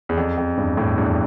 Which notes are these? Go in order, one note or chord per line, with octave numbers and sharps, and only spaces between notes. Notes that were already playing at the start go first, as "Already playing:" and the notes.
E2
F2
F2
E2 G2
F2 A2
E2 G2